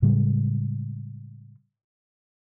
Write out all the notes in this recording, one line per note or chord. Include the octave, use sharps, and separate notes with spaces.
A2 C#3 G3 G#3